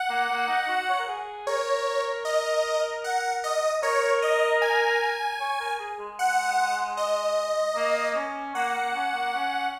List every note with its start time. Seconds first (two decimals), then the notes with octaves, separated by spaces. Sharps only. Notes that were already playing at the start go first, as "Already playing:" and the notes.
Already playing: F#5
0.09 A#3
0.29 A#3
0.48 D#4
0.68 F#4
0.90 C#5
0.99 A#4
1.07 G#4
1.47 A#4 C#5
2.25 D#5
3.04 F#5
3.44 D#5
3.83 A#4 C#5
4.22 D#5
4.62 G#5
5.40 C#5
5.60 A#4
5.79 G#4
5.99 G#3
6.19 F#5
6.97 D#5
7.76 A#3
8.15 C#4
8.55 A#3 F#5
8.75 A#3
8.94 C#4
9.14 A#3
9.33 C#4